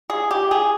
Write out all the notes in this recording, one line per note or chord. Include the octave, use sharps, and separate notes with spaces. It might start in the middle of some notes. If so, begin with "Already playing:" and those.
G#4
G4
G#4